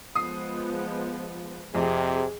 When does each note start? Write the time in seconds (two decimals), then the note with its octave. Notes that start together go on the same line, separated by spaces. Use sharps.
0.15 F3 G#3 B3 D#6 C7
1.75 F2 C3 G#4